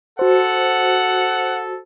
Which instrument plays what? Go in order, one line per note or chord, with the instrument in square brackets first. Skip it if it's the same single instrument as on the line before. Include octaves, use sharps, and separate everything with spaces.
[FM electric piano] F#4 C5 [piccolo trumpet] A4 [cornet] F#5